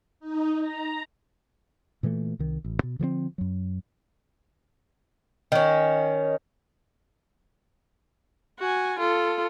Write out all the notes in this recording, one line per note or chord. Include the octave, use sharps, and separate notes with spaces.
D#4
A#5
A#2 E3 G3 A3
C2 D#3
A1
B2
D3 F3 G3 C4
F#2 F#3
D#3 C#4
F#4 G#5
F4 A4